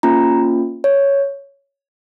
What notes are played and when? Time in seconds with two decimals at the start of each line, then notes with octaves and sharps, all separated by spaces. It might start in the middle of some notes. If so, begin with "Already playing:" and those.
0.03 A#3 C#4 F4 A#5
0.84 C#5